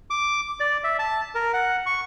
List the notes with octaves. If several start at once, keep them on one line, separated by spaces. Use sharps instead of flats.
D6
D5
E5
A5
A#4
F#5
C#6